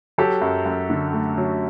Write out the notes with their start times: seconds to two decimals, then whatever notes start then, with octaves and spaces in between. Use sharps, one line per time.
0.18 F#3 G4 A4
0.42 F#2
0.66 F#2
0.90 D3
1.13 A3
1.38 F#3